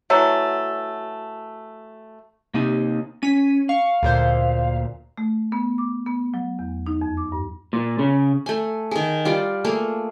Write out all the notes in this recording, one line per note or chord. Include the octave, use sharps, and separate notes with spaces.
E3 F#3 A3
C3 A#3 D#4
C#4 B6 D#7
F5 C#6
D2 A#2 C5
A3
B3
D6
B3
F#3
E2
D#4
F2
D6
G2
A#2
C#3
A3 G#5
D#3 G#4
G3 F4 D5
A3 A#3 G#4